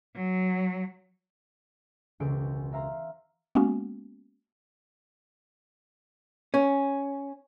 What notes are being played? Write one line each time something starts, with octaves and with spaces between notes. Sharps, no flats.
F#3
E1 C#2 C#3 C5 G6 D7
A#4 E5 F5 A#5 C6
G#3 A#3 B3 C#4 F#4
C#4